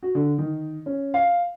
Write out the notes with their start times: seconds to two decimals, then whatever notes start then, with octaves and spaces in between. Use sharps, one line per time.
0.03 F#4
0.15 D3
0.38 D#3
0.86 C#4
1.14 F5